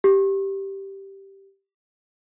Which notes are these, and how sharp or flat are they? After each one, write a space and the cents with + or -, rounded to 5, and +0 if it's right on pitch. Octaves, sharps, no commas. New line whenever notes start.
G4 -5